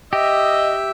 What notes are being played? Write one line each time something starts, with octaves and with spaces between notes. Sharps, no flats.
G4 D#5 E5